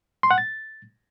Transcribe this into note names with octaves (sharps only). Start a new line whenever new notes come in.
C6
F#5
A6